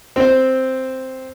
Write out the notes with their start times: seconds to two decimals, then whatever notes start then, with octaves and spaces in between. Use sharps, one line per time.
0.16 C4 C5